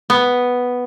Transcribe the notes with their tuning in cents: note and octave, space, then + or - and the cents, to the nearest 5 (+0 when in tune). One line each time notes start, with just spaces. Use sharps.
B3 +0